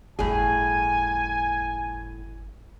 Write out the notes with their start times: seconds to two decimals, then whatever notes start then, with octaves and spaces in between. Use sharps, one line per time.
0.19 G1 E2 A2 G#4 G#5